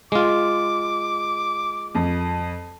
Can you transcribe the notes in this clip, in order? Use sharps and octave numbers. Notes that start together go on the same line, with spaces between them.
G#3 F4 D6
F2